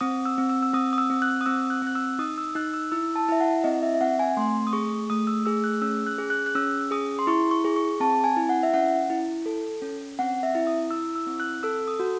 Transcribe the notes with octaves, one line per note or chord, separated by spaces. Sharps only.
C4 D#6
E6
C4
E6
E6
C4 D#6
D#6
E6
C4
F#6
D#6
C4 E6
F#6
C4 F#6
E6
D#4 D#6
E6
D#4 F#6
E6
E4 E6
A5
E4 E5
F#5
C4 D#5
E5
E5
C4 F#5
G#5
A3 C6
D#6
G#4 C#6
A3 D#6
E6
G#4 E6
F#6
C#4 E6
F#6
G#4
F#6
F#6
C#4 E6
G#4 D#6
C6
E4 C#6
C#6
G#4
C#6
C4 A5
G#5
E4
F#5
E5
C#4 F#5
E4
A4
C#4
C4 F#5
E5
E4
D#6
E4 E6
E6
C4
F#6
A4 E6
D#6
F#4